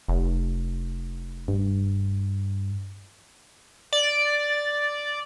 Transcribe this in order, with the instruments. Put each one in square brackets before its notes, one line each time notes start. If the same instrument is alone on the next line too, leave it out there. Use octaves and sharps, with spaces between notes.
[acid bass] F1
[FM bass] G2
[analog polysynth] D5